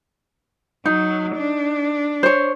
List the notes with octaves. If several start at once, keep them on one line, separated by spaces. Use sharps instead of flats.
F#3 D#4
D4
C5 C#5